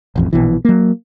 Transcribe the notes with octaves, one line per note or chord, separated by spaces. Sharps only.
E1 A1 F2
A#1 B2 E3
F#3 A#3